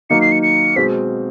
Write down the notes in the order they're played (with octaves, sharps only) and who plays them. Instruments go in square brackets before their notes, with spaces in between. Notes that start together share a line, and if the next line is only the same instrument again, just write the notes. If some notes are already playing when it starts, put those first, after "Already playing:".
[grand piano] D#3 F#3 A#3 D#4 [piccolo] C#7
[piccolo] C7
C#7
C#7
[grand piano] B2 G#3 C4 [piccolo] B6